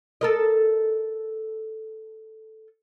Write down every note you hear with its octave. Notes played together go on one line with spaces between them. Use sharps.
A4 A#4 D#5